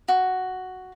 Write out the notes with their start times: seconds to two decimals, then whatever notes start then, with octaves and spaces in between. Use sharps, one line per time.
0.08 F#4